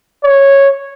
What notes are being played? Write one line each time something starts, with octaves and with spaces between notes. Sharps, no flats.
C#5